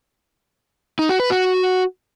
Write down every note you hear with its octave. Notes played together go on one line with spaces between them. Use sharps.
D#4
F#4
B4
F#4